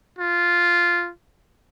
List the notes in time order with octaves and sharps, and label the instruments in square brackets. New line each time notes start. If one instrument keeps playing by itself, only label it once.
[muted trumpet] F4